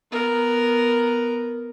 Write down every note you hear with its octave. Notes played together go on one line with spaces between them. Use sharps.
B3 A#4